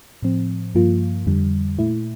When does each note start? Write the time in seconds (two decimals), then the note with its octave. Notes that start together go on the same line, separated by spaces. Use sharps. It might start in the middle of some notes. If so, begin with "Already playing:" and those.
0.22 A2 F3 C4
0.75 G2 F3 A#3 F4
1.26 F2 D3 G3
1.79 A#2 A3 E4